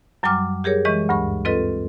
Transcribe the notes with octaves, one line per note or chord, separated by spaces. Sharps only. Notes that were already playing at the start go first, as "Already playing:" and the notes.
F#2 F#3 G3 G#5 D6 F6
G4 G#4 A#4 C#5
E3 G#3 D#5 C#6
D2 G2 C#6
C4 F4 A4 B4 D#5